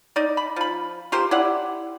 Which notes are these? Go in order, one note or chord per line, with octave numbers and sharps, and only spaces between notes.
D#4 D5
B5
F3 B5
F4 G4 A#4 C5
E4 G4 D5 F#5